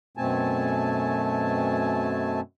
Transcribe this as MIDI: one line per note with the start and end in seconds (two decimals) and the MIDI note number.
0.17 2.41 42
0.17 2.41 47
0.17 2.41 57
0.17 2.41 60
0.17 2.41 80
0.17 2.41 81